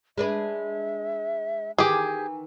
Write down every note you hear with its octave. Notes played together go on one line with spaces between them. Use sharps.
G#3 D4 B4 E5
D#3 E3 G4 G#4 G#5